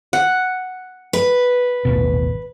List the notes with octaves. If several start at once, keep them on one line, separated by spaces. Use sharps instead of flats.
F#5
B4
D#1 A1 B2